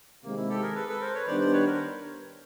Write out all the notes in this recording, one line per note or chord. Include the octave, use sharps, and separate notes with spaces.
C3 D#3 G#3 A#3 C4
E4
G4 A4
G#4 A#4
A4 B4
A4 B4
A#4 C5
B4 C#5
D#3 G3 B3 D4 C5 D5
C5 D5
B4 C#5
A#4 C5